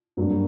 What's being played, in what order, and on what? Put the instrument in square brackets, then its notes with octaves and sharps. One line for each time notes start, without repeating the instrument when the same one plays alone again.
[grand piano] G2 F#3 A#3 D4 F#4